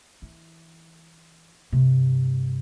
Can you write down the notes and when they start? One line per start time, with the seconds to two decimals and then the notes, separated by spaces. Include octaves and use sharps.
0.22 E3
1.72 G2 C3